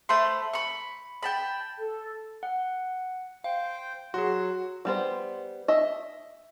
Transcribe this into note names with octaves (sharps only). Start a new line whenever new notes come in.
A3 C5 B5 C6
B5 C#6
G5 A5 B5
A4
F#5
C5 F5 G5
F#3 F#4 G#4 C6
G3 B3 C5
D#5 E5